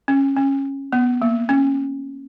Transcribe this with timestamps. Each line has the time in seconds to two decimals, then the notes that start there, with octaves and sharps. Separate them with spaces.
0.08 C#4
0.37 C#4
0.92 B3
1.22 A#3
1.49 C#4